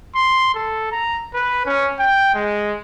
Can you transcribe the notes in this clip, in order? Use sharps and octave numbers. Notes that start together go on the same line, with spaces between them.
C6
A4
A#5
B4
C#4
G5
G#3